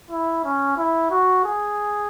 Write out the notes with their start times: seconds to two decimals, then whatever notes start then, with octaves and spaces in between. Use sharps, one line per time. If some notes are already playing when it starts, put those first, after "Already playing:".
0.11 E4
0.45 C#4
0.78 E4
1.11 F#4
1.45 G#4